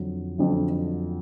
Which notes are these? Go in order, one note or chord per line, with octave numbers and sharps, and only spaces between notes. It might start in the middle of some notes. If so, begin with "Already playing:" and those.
Already playing: F2 D3 F#3
F2 D3 F#3